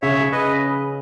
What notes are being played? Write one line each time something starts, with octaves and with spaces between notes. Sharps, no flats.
C#3 C#5 E5
B4 D#5